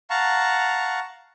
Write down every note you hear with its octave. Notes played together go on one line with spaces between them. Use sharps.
F5 F#5 A5 A#5 C#6